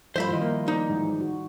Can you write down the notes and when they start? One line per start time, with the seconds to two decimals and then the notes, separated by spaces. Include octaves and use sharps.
0.16 G2 F3 G3 F4 C5 E5 B5
0.29 D#3 F3 E4 F4 D#5
0.42 A#3
0.68 D#4 D5
0.90 G#2 E3
1.21 F#4